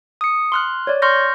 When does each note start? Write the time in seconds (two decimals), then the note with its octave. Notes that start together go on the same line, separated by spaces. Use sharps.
0.21 D#6 C#7
0.52 C6 F6 F#6
0.87 C#5 D5
1.02 C6 C#6 F6 G6 A#6